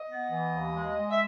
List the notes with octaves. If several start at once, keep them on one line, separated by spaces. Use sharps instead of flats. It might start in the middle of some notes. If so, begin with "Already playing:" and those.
Already playing: D#5
B3
E3
D#2
G#3
G#3
E5